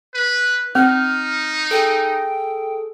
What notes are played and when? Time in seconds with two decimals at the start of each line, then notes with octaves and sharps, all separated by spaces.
0.14 B4
0.75 C4 D#4 F6
1.71 G#4 A4 G5